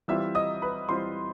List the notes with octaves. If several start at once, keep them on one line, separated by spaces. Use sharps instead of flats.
E3 G3 C4 F4 E5 E6
D#5 D#6
B4 B5
E3 G3 C4 F4 C5 C6